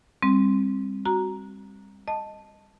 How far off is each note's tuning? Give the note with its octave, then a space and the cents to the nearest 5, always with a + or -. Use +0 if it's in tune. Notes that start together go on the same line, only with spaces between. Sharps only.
G3 +30 C4 +20
F#4 +0 A#5 +0
D#5 +0 A5 +0